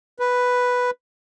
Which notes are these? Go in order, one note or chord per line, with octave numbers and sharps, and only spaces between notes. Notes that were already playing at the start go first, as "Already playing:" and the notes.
B4